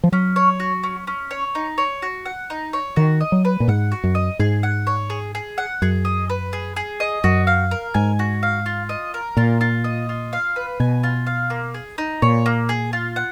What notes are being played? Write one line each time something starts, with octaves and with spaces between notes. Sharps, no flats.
F3
F#3 C#4
C#5
F#4
C#4
C#4
C#5
D#4
C#5
F#4
F#5
D#4
C#5
D#3 F#4
D#5
F#3
B4
A#2
G#2 F#5
F#4
F#2
D#5
G#2 G#4
F#5
C#5
G#4
G#4
F#5
F#2 G#4
D#5
B4
G#4
G#4
D#5
F#2 F#4
F5
A#4
G#2 G#5
F#4
F5
F4
D#5
A#4
A#2 F4
F4
D#5
F4
F5
B4
B2 G#5
F4
F5
A#3
G#4
D#4
A#2 C#5
A#3
G#4
F4
F#5